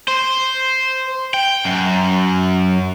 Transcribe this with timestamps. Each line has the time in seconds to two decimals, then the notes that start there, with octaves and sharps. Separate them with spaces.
0.08 C5
1.34 G5
1.65 F#2